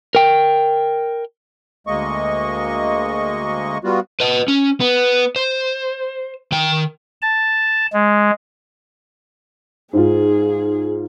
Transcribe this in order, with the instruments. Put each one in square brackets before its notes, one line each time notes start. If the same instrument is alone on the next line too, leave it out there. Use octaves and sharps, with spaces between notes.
[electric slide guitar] A#4 G5
[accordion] D2 G#3 A#3 D#5 C#6
G3 B3 F4 F#4
[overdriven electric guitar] B4 D#5
C#4
B3
C5
D#3 G5
[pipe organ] A5
G#3
[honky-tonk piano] G#2 F4 [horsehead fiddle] G#4